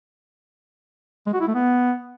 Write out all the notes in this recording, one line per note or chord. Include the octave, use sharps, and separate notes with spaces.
G#3
F#4
E4
A3
B3